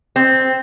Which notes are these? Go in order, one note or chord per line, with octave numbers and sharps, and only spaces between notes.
C4